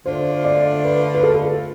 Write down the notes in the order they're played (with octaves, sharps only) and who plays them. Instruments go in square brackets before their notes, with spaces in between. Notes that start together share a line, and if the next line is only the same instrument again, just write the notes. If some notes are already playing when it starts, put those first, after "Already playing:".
[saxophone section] D3 A3 D4 F4 [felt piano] C5
[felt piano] D5
B4
B4
A4